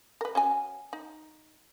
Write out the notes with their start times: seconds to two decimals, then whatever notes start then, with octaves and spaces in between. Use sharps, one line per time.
0.21 A#4 B4
0.35 C#4 F#4 G#5
0.93 D#4